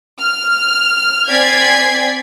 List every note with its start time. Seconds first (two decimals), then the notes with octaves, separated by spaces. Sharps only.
0.20 F6
1.29 C4 D5 G#5 G#6 B6 C7